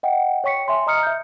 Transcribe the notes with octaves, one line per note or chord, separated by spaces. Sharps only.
D#5 F#5 G5
C#5 G5 C#6 B6 C#7
E5 G#5 C6
D#5 A#5 D#6 F6 C#7
E5 G6